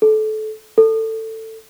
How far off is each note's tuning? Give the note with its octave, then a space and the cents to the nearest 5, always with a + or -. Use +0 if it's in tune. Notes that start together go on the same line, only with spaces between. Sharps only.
A4 -25
A4 +20